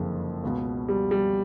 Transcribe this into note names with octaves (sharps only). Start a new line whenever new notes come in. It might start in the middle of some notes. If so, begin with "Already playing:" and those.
Already playing: F#1 F2 D3 G#3
C#2 B2
G3
G3